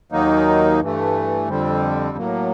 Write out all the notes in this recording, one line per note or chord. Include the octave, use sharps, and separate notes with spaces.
D#2 D#3 F#3 A#3 D#4
G2 E3 A3
F2 D3 G3 C4
A2 F#3 A#3